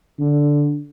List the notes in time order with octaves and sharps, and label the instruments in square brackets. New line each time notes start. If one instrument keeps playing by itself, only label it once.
[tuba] D3